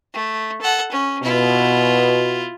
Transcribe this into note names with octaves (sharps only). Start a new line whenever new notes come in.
A3
A4 F#5
C#4
B2 E4 F4